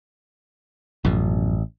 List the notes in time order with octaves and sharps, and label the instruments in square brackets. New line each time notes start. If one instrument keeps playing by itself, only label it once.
[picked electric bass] A1 [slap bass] F#2 B2 F3